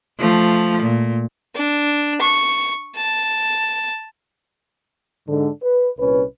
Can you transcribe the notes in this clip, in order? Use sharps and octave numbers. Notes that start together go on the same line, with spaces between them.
F3 A3
A#2
D4
C#6
A5
G#2 D3
B4
C2 A#2 C#4 B4